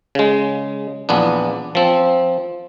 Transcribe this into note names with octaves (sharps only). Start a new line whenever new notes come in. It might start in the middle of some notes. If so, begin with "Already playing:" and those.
C#3 G#3
A#1 E2 B3 D4
F3 C4